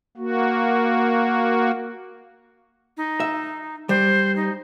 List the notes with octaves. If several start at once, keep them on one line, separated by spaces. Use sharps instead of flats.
A#3 F#4
D#4
E5
G3 C5
D#4